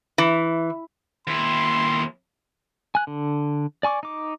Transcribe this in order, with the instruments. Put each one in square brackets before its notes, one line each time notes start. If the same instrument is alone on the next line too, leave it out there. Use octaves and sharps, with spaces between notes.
[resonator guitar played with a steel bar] E3
[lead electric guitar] D#2 E4 [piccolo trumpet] C6
[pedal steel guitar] G#5 F#6
D3
D5 G#5 C#6 D6
D#4 D6